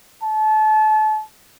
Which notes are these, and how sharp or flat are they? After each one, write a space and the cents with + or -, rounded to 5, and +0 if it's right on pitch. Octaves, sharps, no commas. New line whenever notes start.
A5 -30